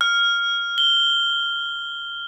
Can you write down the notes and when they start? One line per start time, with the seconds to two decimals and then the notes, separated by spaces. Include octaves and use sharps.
0.01 F6
0.78 G7